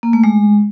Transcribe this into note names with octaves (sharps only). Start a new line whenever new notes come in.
A#3
A3
G#3